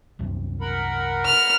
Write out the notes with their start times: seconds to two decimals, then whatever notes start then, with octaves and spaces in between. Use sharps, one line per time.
0.19 C2 F#2 C3
0.61 A#4 F#5 B5
1.25 F6